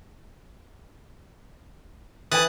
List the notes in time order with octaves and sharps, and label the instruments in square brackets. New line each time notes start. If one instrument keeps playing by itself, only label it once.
[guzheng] E3 [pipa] C5 G5 G#5 [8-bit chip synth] D#6 F#6 A6